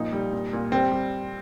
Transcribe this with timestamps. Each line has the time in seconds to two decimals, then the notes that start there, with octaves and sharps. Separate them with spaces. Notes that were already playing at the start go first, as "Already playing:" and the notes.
Already playing: A#2 F3 D#4
0.12 G3
0.33 A#2
0.53 A#2
0.72 G3 C4
0.92 G3